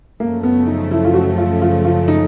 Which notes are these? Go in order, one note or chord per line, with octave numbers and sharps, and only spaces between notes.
F#2 C#3 F3 A3 A#3
B3
D#4
E4
F4
F#4
F4
F4
F4
D#4